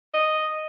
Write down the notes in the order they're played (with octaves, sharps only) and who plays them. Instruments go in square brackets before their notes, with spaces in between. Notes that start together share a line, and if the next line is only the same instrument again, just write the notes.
[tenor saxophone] D#5